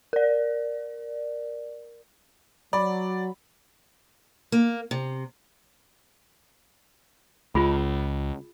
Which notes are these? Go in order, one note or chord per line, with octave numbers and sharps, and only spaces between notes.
A#4 D5
F#3 D5 B5
A#3
C3
C#2 F4 G#4 B5